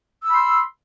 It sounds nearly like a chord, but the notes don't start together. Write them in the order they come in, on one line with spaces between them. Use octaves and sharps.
E6 B5 C6